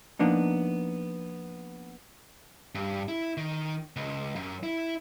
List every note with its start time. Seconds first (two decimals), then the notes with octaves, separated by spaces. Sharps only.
0.19 F3 A#3 B3 D4 D#4
2.75 G2
3.08 E4
3.37 D#3
3.96 C#2
4.36 F#2
4.63 E4